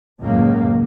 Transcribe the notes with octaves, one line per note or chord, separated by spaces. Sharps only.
C#2 F#2 A2 C#3 A#3